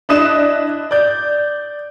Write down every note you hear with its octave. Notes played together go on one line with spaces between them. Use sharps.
D4 E4 D#5 D#6 F#6 E7
D5 G6